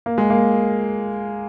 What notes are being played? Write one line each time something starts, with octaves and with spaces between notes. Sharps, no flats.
A#3
G#3
A#3